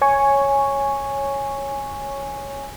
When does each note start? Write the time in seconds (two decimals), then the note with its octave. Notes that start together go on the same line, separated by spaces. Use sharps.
0.01 C#5 G#5 C#6